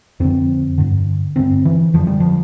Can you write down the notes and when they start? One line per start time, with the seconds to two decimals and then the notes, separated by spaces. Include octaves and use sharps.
0.20 F2 D3 C4
0.78 G2 D3
1.36 G2 D3 C4
1.65 E3
1.94 F2 D3 F3
2.07 G3
2.20 F3